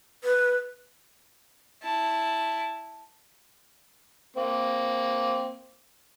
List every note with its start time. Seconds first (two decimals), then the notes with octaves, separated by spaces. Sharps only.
0.24 B4
1.83 E4 A5
4.37 A#3 C4